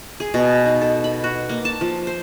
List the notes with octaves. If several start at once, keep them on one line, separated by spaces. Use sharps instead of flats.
G#4
B2
D#4
A4
B5
F#4
A#3
A5
F3
C5